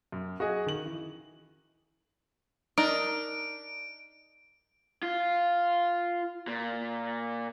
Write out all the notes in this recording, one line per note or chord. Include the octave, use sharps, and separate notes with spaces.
F#2
F#4 G#4 D#5
D#3 F#7
E3
D4 D#4 A#4 D7
F4
A#2